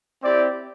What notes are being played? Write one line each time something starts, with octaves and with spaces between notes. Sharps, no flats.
C4 E4 G4 D5